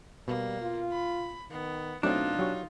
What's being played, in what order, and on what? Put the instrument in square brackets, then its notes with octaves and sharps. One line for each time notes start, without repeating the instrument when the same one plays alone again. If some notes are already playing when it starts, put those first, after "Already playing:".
[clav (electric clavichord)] B2 [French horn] G3 [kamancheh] A#3
[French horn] F4
[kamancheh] B5
[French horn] D#3 [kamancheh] B3
[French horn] B2 [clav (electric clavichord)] F#3 A3 C4 [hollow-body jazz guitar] D4 [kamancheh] D#4 F4
[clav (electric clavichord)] F#3 G4 C#5